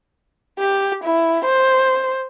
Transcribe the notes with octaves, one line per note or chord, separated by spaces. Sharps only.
G4
E4
C5